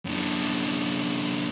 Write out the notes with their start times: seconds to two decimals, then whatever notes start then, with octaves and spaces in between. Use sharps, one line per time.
0.05 F#2 D3